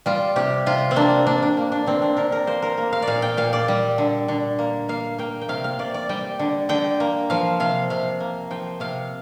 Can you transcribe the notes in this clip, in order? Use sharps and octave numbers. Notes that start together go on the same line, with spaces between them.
G3 F4
C3 G4
C3 F4
C4
A#3 D4
A#3 D4
D4
A#3
D4
D3 C4
D4
D3 A#4
A#4
A#3 C5
A#4
A#3
F5
D5
A#2 F5
G5
A#2 F5
D5
G3
D3
D3
A#3
A#3 F5
A#3 G5
G5
C3 F5
F5
C3 D5
D5
G3 G5
D3
D3 G5
A#3
F3 F5
C3 F5
C3 F5
A#3
F3 G5
C3 F5